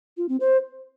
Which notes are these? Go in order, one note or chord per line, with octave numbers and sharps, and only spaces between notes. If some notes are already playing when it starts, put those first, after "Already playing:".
F4
C4
C5